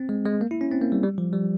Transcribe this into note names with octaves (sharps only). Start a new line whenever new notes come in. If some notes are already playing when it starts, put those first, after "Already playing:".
Already playing: C4
G#3
G#3
A#3
E4
C#4
C4
A#3
G3
G3
F3
G3